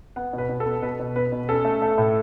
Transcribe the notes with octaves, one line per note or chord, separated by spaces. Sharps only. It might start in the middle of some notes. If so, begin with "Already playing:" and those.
B3 F#5
B2
B4
B2
A4
B3
B2 B4
B2
B3 B4
B2
C#4 A4
A3
A3
A2